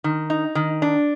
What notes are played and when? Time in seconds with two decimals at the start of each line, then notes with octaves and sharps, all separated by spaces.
0.04 D#3
0.30 D#4
0.55 D#3
0.82 D4